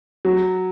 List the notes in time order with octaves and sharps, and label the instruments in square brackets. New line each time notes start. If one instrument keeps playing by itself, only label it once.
[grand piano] F#3